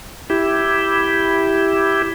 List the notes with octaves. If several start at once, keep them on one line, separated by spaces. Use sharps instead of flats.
E4 G4